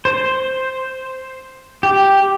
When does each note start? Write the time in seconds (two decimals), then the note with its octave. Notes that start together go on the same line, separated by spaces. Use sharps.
0.05 C5
1.83 G4